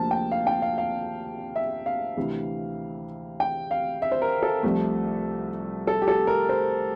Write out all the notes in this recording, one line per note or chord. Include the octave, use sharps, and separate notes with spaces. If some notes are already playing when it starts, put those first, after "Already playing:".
Already playing: D2 C3 F3 A#3 A5
G5
F5
G5
F5
F5
E5
F5
D2 C3 E3
G5
F5
E5
C5
A#4
A4
C2 C3 F3 A3
A4
G4
A4
A#4
C5